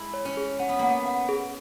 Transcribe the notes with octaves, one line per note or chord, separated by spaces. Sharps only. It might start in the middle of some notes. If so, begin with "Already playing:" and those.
Already playing: G#3 E4
C#5
C#4
G#4
C#4 F#5
B3
A#3 F#5
B3
F#5
G#4